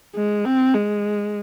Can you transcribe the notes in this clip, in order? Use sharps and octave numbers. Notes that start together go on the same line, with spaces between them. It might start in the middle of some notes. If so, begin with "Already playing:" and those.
G#3
C4
G#3